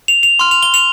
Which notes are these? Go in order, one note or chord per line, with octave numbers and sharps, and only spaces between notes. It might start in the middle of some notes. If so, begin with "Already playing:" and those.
F7
F7
C6 F6
F7
G7
F7